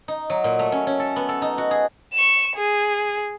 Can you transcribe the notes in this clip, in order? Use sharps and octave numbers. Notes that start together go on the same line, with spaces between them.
D#4
F#3
A#2
A3
C#4
C#4
A4
B3
A4
D#4
F#4
G#4
C#6 E7
G#4